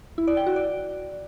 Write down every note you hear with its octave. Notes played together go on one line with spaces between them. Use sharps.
E4
D5
G5
F#4
D5